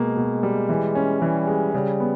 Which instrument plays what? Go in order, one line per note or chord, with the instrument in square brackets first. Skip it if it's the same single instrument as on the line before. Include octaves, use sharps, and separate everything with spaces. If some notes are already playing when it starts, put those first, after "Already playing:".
Already playing: [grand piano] B2 A#3 [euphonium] G#3
[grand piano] B2
G3
E3
C#4
[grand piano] E3 [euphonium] G3
[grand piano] G#3
[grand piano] C#3 [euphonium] G3
[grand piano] B3